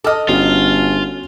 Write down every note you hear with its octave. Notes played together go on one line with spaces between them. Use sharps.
A4 D#5 D6 F6
G1 C#4 F4 F#4